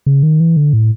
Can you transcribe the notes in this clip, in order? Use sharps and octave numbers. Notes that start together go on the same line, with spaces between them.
C#3
D#3
E3
D3
A2